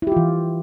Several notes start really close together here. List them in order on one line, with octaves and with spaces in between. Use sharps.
E4 G4 F4 E3